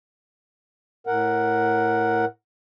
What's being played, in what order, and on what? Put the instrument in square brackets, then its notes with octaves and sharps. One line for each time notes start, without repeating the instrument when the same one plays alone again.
[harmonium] A2 A#4 F#5